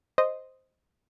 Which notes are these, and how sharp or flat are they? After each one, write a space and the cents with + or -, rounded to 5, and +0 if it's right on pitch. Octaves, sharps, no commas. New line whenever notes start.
C5 +0 D#5 +0